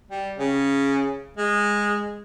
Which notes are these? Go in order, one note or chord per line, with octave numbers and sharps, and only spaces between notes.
G3
C#3
G#3